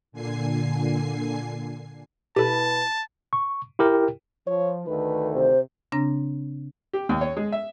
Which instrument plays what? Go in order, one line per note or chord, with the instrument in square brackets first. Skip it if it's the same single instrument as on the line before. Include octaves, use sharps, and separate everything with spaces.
[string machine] A#2 D3 G#5 C7
[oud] B2 E4 B4 [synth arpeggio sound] G4 A4 [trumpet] A5
[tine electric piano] C#6
E4 G4 A#4 G5
[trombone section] F3 [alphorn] C#5
[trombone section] D2 D#3 A3 [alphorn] B4
[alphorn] C3 [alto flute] C5
[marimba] C#3 C4 D4 A#5 A#6
[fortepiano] G4
D#2
C#5
G#3
E5